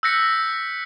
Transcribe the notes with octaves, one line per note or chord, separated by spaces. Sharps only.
E6 F#6 G6 A#6 B6 C#7